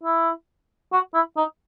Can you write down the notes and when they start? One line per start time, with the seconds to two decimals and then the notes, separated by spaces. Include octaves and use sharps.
0.03 E4
0.93 F#4
1.14 E4
1.37 D#4